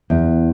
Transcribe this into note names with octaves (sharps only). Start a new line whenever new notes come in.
E2